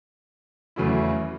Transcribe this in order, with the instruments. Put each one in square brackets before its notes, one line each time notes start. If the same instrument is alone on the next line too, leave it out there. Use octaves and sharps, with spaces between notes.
[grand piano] E2 C#3 F#3 A3 E4